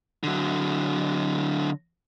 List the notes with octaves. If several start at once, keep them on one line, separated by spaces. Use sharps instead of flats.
D3 F#3